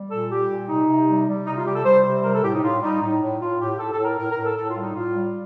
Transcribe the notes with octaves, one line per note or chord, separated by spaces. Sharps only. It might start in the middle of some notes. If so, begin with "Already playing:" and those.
Already playing: G3
A#2 A4
G3 G4
A#2
C3 D#4
C3
G3
G3
C3 D#4
F4
G3 G4
A4
G3 C5
C3 C5
G3 A#4
A4
A2 G4
D#4
A2 F4
G3 D#4
A2 D#4
A2
A2 F4
A2 G4
A2 A4
A4
A2
A#4
A2 A#4
A#4
A2
A4
A2 A4
F4
G3
D#4
A2 F4
G3